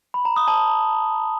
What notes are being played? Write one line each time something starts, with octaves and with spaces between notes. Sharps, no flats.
B5
A#5
D#6
A5